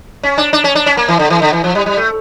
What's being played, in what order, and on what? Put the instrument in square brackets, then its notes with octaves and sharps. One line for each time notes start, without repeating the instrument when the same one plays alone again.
[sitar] C#4
D4
D4
C#4
D4
C#4
A#3
E3
D3
E3
D3
E3
F3
G3
G3
A3